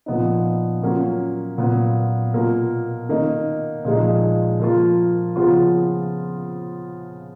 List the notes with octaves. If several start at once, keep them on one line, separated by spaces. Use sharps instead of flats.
A#2 F3 B3 D#4
F#3 A#3 C#4 F4
A#2 F#3 B3
B2 A#3 F4
D#3 A#3 D#4
A#2 F3 G#3 D#4
F3 A#3 F4
C#3 F3 B3 F4